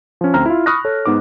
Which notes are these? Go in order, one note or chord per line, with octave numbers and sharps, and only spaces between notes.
F3 C#4
D2 C4 A#5 F6
E4 F4
B5 C#6 D#6 F6 F#6 A#6
A4 C#5
G#2 B3 D#4 D6